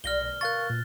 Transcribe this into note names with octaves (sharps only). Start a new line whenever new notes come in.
B1 G3 F4 F6 A#6 G7
D2 B2
A#4 F5 C#6 F#6 A6
A#2